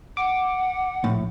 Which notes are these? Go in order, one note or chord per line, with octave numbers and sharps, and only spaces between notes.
F#5 D6
A#1 A2